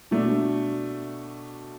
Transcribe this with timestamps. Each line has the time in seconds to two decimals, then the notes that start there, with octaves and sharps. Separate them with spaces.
0.11 B2 A3 D4